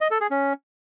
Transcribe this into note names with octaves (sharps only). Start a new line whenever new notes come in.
D#5
A4
G#4
C#4